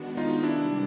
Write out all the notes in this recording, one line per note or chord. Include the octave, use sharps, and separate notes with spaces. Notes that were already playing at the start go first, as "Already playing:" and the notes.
Already playing: D#3 G#3 B3 D4 F#4
D#4 F4
C3 D#3 G3 D4 E4